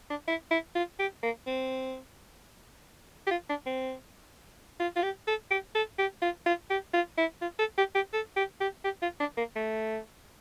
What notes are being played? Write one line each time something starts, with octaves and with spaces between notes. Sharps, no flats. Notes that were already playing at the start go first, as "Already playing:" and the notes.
D4
E4
E4
F4
G4
A#3
C4
G4
F4
D4
C4
F4
F4
G4
A4
G4
A4
G4
F4
F4
G4
F4
E4
F4
A4
G4
G4
A4
G4
G4
G4
F4
D4
A#3
A3